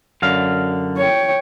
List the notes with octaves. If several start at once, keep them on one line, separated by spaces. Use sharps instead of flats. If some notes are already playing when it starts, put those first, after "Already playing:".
F#2 D3 F5
C#5 G5